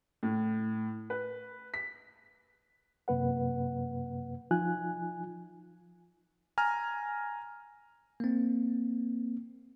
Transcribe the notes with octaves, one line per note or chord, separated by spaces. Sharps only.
A2
B4
B6
F#2 C3 A#3 B4 F#5
F3 D#4 F4 G#5 F#6
G#5 A#5 F6
A#3 C4